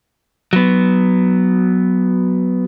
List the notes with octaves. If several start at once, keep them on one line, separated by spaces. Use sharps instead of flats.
F#3 B3